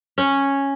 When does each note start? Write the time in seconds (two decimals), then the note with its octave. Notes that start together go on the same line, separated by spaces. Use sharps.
0.18 C#4